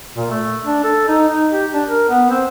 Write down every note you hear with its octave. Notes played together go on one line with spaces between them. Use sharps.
A#2
A3
D4
A4
D#4
D#4
G4
D4
A#4
B3
C4